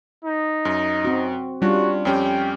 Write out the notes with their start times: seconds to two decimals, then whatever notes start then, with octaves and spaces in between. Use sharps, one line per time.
0.25 D#4
0.65 F#2
1.05 C4 F#4
1.62 G3 C#4 D4 F4 F#4
2.05 F2 C#4 G4 G5